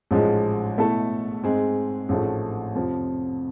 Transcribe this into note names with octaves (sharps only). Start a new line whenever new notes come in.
A1 G#2 F3 G#3
B2 A3 E4 A4
G#2 G#3 C4 G#4
A1 G#2 F3 A3
F2 C3 F3